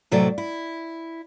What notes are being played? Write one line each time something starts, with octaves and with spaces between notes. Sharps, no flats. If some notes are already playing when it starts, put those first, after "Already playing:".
A2 C3 F#3 A3 D5
E4